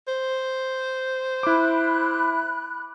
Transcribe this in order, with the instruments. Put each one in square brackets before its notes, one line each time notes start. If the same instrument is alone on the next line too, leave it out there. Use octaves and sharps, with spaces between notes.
[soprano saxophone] C5
[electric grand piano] E4 D6 [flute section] B5 F#6